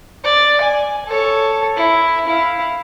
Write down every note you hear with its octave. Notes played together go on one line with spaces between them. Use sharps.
D5
G#5
A4 C#5
E4
E4 F5